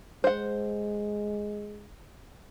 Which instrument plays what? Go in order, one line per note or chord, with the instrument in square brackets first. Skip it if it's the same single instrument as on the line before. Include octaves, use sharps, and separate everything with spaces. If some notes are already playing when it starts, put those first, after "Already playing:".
[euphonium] G#3 [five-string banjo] C5 F#5